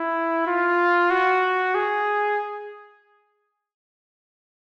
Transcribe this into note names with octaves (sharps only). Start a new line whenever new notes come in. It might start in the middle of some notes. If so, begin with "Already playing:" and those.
Already playing: E4
F4
F#4
G#4